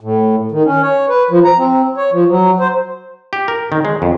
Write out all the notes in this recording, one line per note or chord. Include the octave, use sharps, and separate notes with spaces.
A2
D#3
C#4
C#5
B4
F3
A#5
C4
C#5
F3
F#3
C5
G4
A#4
D#3
G#3
F2